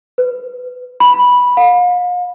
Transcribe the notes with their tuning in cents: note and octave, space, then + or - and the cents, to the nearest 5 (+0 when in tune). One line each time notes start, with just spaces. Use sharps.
B4 +20
B5 -10
F5 +40